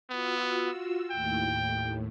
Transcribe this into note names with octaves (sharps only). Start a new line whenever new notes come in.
B3 F4 F#4 E6
D#2 A2 G5